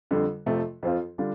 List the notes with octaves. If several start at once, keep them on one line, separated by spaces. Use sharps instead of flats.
F2 D3 G3
F2 C3 F3 A3
F2 F3 C4 F4
D3 G3 D4 F4